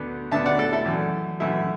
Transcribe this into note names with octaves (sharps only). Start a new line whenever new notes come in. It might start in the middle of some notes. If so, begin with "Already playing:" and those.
Already playing: D2 D3 B3
D2 D3 B3 E5 A5
D5 F#5
A4 D5
E4 A4
F#2 E3 A3
F#2 E3 A3 E4